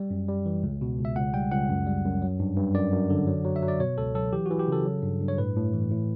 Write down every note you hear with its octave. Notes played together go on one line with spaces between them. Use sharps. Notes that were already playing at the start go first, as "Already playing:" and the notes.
Already playing: G3
F#2
G3
E3
C#2
B2
C#2
E5
C#2 F#5
G3 G5
C#2 F#5
F#2
G3
F#2
F#3
G2
G2
F#2 D5
F#2
D3
F#3
F#3
E5
F#3
D5
B2 C#5
C#2 A4
F#3 A4
E3 G4
E3 F#4
G4
C#3 A4
F#3
G2
G2
C#5
A2 B4
A2
E3
A2